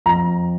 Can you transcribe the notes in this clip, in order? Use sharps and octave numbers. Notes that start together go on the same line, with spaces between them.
F2 A#5